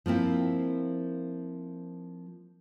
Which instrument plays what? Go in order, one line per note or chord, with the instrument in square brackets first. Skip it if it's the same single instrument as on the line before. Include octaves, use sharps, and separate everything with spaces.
[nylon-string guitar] F3 A#3 C4 E4